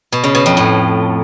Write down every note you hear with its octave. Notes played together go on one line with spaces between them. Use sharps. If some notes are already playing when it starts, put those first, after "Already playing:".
B2
C#3
B2
F2
A2